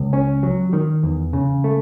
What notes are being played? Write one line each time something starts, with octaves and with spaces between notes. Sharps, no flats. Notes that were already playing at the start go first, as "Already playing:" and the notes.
Already playing: C#2
C#4
F#3
D#3
E2
C#3
A3